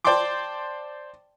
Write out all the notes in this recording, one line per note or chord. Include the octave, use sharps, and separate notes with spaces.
C5 D5 G5 A5 C6 D6